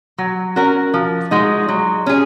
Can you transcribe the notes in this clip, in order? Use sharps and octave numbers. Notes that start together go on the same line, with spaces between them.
F#3
C#4 F#4 A#4
F3
G#3 D#4 F#4
F#3
C#4 G#4